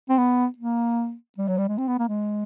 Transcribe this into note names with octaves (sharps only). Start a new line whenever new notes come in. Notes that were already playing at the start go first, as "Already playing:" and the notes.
C4
B3
A#3
G3
F#3
G3
G#3
C4
B3
A#3
G#3